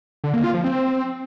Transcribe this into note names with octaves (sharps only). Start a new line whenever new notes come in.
D3
A#3
F4
F3
C4